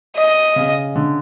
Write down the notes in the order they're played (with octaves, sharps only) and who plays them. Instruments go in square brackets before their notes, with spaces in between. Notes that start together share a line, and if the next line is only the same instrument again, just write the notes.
[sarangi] D#5
[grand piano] C#3
D3